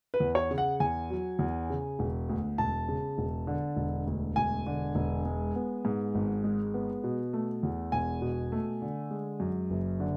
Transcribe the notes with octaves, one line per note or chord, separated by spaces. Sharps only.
B4
E2
C#5
C#3
F#5
E2 G#5
F#3
E2
C#3
E1
D2
E1 A5
C#3
E1
D3
E1
D2
E1 G#5
D3
E1
G#3
B3
G#2
G#1
G#3
B3
B2
A3
E2
E1 G#5
B2
A3
D3
G#3
F#2
F#1
D3